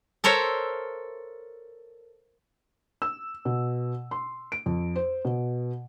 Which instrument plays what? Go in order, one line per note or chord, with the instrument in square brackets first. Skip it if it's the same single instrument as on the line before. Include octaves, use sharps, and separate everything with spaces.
[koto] A4 A#4 C5 C#5 E5
[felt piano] E6
B2
C6
D7
F2
C5
B2